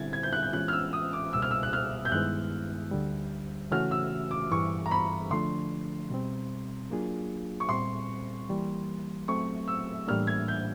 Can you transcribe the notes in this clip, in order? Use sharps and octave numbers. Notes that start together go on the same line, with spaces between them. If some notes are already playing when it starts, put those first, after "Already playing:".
Already playing: D3 G3 C4 E4 G#6 A6
G#6
G6
F#6
G6
E3 G#3 C#4 F4 F#6
F6
E6
D#6
D6
C#2 B2 G3 A#3 E6
F6
E6
F#6
F6
G6
G2 D#3 G#3 B3 E4 F#6
D2 D3 G3
C#3 E3 A3 C#4 F#4 F6
E6
D6
G2 E3 G3 C#6
A#5
B5
D3 F3 A3 D4 C6
B2 G3 C4
F#3 A#3 D4 F4 G#4
C#6
A#2 G3 C4 C6
E3 G3 A#3
F#3 A3 C4 C#6
E6
A2 E3 G3 A#3 D4 F6
G#6
G6